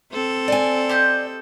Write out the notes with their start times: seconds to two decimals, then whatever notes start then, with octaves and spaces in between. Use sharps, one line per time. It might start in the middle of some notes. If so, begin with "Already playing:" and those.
0.12 C4 A4
0.48 D5 G#5
0.89 G4 C5 D#5